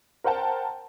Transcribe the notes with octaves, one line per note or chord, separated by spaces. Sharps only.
A#4 C5 F#5 G5 A5